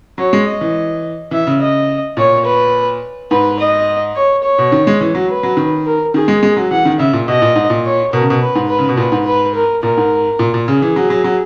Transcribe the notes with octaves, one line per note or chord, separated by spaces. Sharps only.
F#3 C#5
G#3
D#5
E3
E3 E5
C#3
D#5
A#2 C#5
B4
G#2 B4
D#5
C#5
C#5
B2
D#3
G#3
E3
F#3
B4
F#3
D#3
A#4
D#3 G#4
G#3
G#3
F#3
E3 F#5
D#3
C#3 E5
A#2
B2 D#5
A#2
G#2
A#2
C#5
B2 A#4
C#3
B2
B4
G#2
B4
C#3
B2
A#2 B4
G#2
B4
A#4
A#2 A#4
G#2
A#2
A#2
C#3 G#4
E3
F#3
F#3
F#3